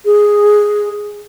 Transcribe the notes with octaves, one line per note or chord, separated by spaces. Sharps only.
G#4